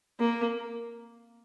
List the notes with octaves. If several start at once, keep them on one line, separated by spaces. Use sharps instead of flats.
A#3